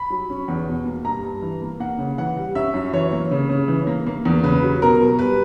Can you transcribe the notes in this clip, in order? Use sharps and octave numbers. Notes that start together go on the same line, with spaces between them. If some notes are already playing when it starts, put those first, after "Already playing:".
Already playing: B5
F#3
C#4
E2
B2
A#3
G2 A#5
G2
E3
A#3
A#3 F#5
C#3
E3 F#5
G3
C#4 E5
F#2
E3 C#5
A#3
C#3
C#3
E3
A#3
A#3
E2
C#3 B4
F#3
B2 A#4
B2
G3 B4